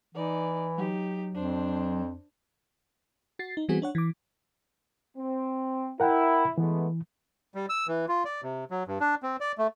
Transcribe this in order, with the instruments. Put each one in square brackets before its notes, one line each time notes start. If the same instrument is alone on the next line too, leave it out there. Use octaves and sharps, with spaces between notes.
[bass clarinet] E3 [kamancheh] D#4 D5
[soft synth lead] F#3 [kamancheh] D#4 G4
[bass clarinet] F2 [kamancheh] D4 C5
[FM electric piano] F#4 A6 C7
D#4
E3 G3 B3 C4 F#4 G#4
D4 C#5 F#5
E3 D6
[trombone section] C4
[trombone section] E4 [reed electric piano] A#4 F#5 G5
[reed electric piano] E3 [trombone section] G#3 A3 B3
[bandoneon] G3
E6
E3
F4
D5
C3
F#3
G2
D4
C4
D5
A3